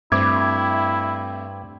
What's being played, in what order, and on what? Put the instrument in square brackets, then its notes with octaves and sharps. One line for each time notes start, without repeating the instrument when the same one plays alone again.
[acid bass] G2 [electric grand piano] A3 C4 E5 [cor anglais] E4 [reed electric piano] D6 G#6